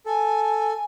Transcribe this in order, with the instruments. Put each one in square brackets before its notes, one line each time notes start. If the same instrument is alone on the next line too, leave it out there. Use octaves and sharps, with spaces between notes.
[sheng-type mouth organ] A4 [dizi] G#5